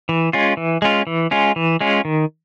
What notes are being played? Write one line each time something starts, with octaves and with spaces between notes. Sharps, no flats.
E3
G#3 C#4 F4
E3
G#3 C#4 F4
E3
G#3 C#4 F4
E3
G#3 C#4 F4
D#3